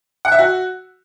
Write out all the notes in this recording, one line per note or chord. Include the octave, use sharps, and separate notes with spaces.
F#5
E5
F#4